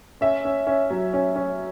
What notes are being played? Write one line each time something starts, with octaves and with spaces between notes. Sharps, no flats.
C#4 E5
C#4
C#4
F#3
C#4
C#4